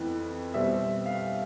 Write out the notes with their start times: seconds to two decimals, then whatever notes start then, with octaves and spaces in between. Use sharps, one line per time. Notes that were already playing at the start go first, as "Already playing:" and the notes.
Already playing: F2 E3 B3
0.54 B2 G3 C4 E5
1.05 F5